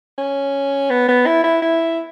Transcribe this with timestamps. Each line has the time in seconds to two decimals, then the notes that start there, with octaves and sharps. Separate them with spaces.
0.18 C#4
0.90 B3
1.08 B3
1.26 E4
1.44 E4
1.62 E4